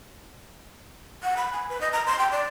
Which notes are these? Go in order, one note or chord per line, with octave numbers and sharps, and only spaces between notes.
F#5
B5
G#5
B4
D#5
A#5
C6
G5
D5